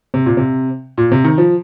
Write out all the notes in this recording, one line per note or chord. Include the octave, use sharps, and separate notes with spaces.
C3
A#2
C3
A#2
C3
D#3
F3